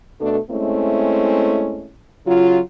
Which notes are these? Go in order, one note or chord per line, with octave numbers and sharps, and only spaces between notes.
B2 A3 D4 A4
G#3 A3 C4 C#4 E4
C#3 F#3 F4